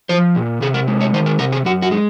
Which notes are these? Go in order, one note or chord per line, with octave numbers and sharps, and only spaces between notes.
F3 C5
A#2
C3 G#4
A#4
G#3
C#5
D#3 C5
A#4
C3 A#4
G#4
F#2 F#4
F#4
G#3